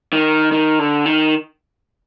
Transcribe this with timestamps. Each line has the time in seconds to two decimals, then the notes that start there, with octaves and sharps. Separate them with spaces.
0.13 D#3
0.52 D#3
0.79 D3
1.06 D#3